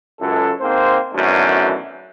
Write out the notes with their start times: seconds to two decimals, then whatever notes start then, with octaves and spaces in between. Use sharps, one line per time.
0.20 C#2 F#2 A4
0.60 G#2 A#3 C4 C5
1.14 G#1 F#2 B2 D3 E3 A3